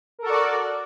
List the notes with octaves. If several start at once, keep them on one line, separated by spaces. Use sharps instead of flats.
F#4 A4 A#4 D5